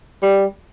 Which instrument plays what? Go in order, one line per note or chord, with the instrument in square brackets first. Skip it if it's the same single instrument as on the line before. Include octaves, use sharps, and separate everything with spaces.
[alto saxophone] G3